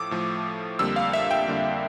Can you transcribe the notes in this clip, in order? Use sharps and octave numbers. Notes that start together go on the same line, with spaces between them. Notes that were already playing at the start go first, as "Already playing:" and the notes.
Already playing: A2 F3 A3 D6 E6
A2 F3 A3
F2 D3 G3 A#3 E6
F5
E5
G5
F2 D3 G3 A#3